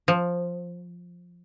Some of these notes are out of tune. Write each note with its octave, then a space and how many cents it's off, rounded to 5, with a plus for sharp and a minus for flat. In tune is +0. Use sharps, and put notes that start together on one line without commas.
F3 +5